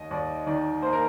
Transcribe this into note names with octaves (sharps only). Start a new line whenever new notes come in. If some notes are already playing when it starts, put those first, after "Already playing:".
Already playing: D#2 D#5
D#2 D5
D#3 D5
A#3 C5
A#4